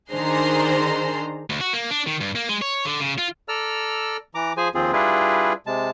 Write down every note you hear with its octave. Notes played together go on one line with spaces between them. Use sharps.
D#3 D4 G#4 C5 A#5 C6
D2
F#4
A#3
D4
D#3
G2
A#3
G#3
C#5
D3
C#3
F4
A4 D5 A#5 E6 F6
E3 A#5 D6
F3 G#4 C5 G#5
D#2 F3 C4 F4 G#4
G3 D4 E4 F4 G#4 B4
C3 G#3 A5